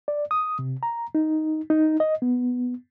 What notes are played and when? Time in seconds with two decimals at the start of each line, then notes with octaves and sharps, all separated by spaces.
0.08 D5
0.31 D#6
0.59 C3
0.83 A#5
1.15 D#4
1.70 D#4
2.00 D#5
2.22 B3